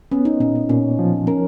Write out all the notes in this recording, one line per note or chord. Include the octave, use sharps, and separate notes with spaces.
B3 C#4
D#4
A#2 C#4
C#4
A#2 C#4
F3
C#4 A#4